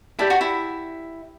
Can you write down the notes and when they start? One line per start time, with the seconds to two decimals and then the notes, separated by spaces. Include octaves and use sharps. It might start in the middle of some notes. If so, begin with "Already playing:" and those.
0.19 E4 G4 D5 A5
0.30 F#4
0.41 E4